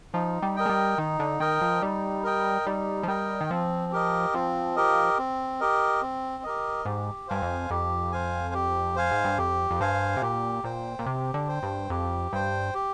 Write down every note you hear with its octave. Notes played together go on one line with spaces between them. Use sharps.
F3 D#4
G3
A#4 D#5 G5
G#3
G3
D#3 D#4
D3
D#3 A#4 D#5 G5
F3
G3 D#4
A#4 D#5 G5
G3 D#4
F3
G3 A#4 D#5 G5
D#3
F3 C4
G4 A#4 D#5
F3 C4
G4 A#4 D#5
C4
G4 A#4 D#5
C4
G4 A#4 D#5
G#2 G4
G2 C5 F5 G#5
F2
F2 G4
C5 F5 G#5
G4
C5 F5 G#5
G#2
G2
F2 G4
F2
G2 C5 F5 G#5
C3
A#2 G4
A#2 C5 G5
A#2
C3 G4
D3
C5 G5
G2
F2 G4
G2 C5 G5
G4